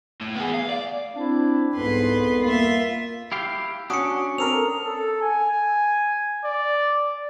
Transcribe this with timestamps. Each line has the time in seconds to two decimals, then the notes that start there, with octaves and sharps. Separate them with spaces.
0.21 A2
0.36 B3 G#4
0.54 F5
0.69 D5
1.16 C4 D4 E4
1.75 C2 F2 G#2 B3 B4 C6
2.43 A#3 F4 E5
3.32 E4 G4 F5
3.90 C#4 D4 F#4 D#6 C#7
4.38 C4 A4 A#4 F7
4.84 A4
5.22 G#5
6.45 D5